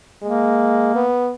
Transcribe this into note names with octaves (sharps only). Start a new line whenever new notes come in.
G#3 A#3
B3